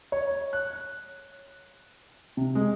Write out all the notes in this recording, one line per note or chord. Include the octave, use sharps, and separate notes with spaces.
C#5
F#6
C3
G#3